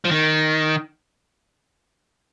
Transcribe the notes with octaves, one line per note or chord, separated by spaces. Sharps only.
F3
D#3